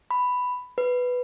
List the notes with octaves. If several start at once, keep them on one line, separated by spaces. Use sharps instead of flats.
B5
B4